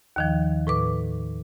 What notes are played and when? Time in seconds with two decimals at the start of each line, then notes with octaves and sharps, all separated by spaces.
0.16 D#2 D#3 F3
0.67 A2 B4 D6